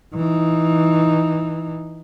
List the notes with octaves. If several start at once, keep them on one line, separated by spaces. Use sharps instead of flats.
E3 D#4